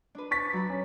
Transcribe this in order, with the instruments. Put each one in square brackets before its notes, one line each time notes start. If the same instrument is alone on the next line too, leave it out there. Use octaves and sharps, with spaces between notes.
[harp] D4 B4
[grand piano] C#6 A6 B6
[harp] F#3 B5
[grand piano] C#4